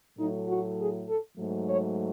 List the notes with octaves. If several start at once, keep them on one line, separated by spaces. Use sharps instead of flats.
A2 F#3 A3 D#4
F#4
G#4
A4
G#2 F#3 A3
C#5